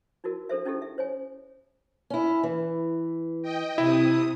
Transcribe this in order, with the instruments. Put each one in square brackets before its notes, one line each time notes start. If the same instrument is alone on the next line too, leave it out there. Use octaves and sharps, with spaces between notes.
[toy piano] D#4 E4 F#4 A#4
D4 A4 C5 E5
C#4 D#4 E4 G4 A4
E5
C5 C#5 G#5
[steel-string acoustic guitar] C#4 E4
E3
[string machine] D#5 G5
[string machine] C3 D#6 [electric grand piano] E4